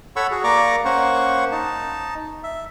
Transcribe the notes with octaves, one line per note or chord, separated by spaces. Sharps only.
A4 C#5 F#5 B5 C#6 E6
F#4 G#4
A#3 D5 A#5 C#6 D6
A#3 C#4 C5 F#5 C#6
D#4 A5
E5